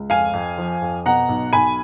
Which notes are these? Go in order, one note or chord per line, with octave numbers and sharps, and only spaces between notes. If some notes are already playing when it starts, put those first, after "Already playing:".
Already playing: C#2
F2 F5 G#5
F2
F3
F2
B2 F#5 A#5
B1
B1 G#5 B5